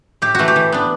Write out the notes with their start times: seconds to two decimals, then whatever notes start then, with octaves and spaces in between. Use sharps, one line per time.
0.22 A2 G4
0.35 E3 A3 F#4
0.48 G4
0.56 E3
0.72 B3 D4